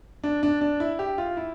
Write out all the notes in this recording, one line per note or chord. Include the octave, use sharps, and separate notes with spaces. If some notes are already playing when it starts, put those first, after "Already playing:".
D4
D4
D4
E4
G4
F4
E4